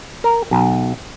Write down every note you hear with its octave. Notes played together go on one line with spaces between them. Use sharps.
A#4
B1